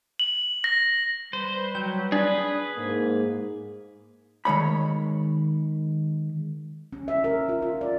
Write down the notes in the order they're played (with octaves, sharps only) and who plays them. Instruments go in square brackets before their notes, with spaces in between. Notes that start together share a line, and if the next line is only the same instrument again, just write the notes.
[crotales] F#7
A#6
[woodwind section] G3 B4 [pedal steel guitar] C5
[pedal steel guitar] F#3 [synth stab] G5
[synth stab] D4 [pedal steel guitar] G#4 B4 [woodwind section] G#5 D#6
[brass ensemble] G#2 A#3
[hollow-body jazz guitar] D#3 G#3 C#5 B5
[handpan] C#4
E5
A#4
F4
F4
D5